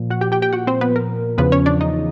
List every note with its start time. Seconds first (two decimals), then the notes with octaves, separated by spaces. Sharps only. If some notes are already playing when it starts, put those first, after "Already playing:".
Already playing: A#2 F3
0.10 F#4 F#5
0.21 G4 G5
0.32 G4 G5
0.42 G4 G5
0.53 F#4 F#5
0.67 C4 C5
0.81 B3 B4
0.96 A#4
1.38 E2 C#3 F3 B3 B4
1.52 C#4 C#5
1.66 D4 D5
1.81 D#4 D#5